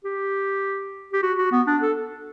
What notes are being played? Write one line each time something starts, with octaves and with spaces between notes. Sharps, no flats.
G4
G4
F#4
F#4
B3
D4
A4